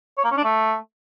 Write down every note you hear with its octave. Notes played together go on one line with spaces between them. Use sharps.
C#5
A#3
C#4
D4
A3